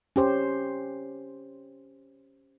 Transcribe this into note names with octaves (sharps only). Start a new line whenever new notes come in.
C#4 G4 C5